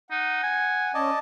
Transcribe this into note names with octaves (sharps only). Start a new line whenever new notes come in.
D#4 F#5
G#5
C#4 D5 D#5 A5